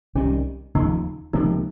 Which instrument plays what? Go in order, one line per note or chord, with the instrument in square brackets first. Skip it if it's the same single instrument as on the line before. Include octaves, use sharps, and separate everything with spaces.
[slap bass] C2 C3 D#3 G3 [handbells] C#4
[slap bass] F1 D#2 C#3 F3 [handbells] D#4
[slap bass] C#2 C3 F3 A#3 [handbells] D#4